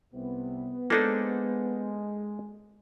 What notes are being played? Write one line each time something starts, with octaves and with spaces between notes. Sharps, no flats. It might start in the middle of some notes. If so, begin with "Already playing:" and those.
C2 C3 B3
G#3 A#3 D4 D#4 A4 C5